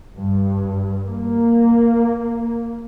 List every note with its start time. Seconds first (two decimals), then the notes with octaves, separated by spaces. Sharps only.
0.16 G2
1.06 A#3